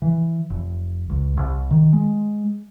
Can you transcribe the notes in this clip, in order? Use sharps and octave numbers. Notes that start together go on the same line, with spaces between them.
E3
F1
C#2
C2
D#3
G#3